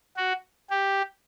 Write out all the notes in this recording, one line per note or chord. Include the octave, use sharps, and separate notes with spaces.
F#4
G4